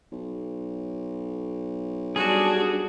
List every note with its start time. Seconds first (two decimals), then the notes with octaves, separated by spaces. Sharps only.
0.12 B1
2.16 G3 D4 F#4 G#4